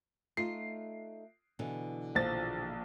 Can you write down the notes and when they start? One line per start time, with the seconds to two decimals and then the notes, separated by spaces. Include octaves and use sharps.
0.37 A3 D#4 F4 C7
1.59 B2 D3 E3
2.15 A#1 F3 A6